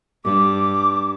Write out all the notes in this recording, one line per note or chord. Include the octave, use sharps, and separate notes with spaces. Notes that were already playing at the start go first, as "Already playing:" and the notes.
G2 D6